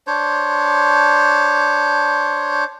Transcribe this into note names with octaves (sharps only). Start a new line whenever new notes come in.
D4 C5 C#5